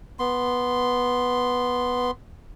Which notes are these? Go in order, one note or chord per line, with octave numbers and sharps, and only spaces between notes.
B3 C6